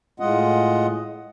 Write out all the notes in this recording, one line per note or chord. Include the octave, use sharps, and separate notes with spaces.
A2 G#3 F4 D#5 F#5